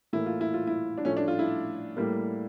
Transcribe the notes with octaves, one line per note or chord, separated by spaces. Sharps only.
A2 E3 A#3 E4
F4
E4
F4
E4
D4
A2 F3 A3 C#4
D4
F4
E4
A2 G3 A#3